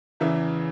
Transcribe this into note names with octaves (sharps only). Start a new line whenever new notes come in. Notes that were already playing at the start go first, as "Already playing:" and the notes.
E2 C#3 E3 E5